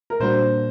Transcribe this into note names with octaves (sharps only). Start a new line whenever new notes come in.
A#4
A#2 G3 A#3 D4 F#4 C5